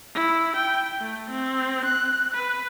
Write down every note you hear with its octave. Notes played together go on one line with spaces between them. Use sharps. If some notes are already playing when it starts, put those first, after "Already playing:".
E4
G5
A3
C4
F#6
B4